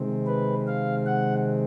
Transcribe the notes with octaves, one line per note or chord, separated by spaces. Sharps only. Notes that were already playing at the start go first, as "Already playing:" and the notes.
Already playing: C3 D#3 G#3 C4
B4
F5
F#5